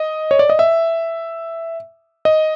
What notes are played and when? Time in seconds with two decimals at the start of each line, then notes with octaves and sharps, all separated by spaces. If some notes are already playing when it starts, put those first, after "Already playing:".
Already playing: D#5
0.31 C#5
0.39 D5
0.50 D#5
0.59 E5
2.25 D#5